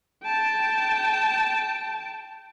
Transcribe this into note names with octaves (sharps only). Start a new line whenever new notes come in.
G5 A5